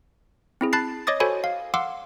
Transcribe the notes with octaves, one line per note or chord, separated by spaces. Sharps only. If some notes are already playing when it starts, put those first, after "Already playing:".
C4 E4 G#4
A5 B5 F#6 A6 C7
C#5 D#5 D6 D#6 A6
F#4 A4 C5 C#5 G#5 B5
F5
F5 F#5 C6 D6 E6